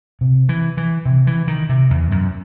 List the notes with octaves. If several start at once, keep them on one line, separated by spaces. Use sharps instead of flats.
C3
E3
E3
C3
E3
D#3
C3
E2
F#2